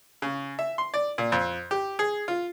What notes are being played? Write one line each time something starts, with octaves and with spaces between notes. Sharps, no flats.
C#3
E5
C6
D5
A#2
F2
G4
G#4
F4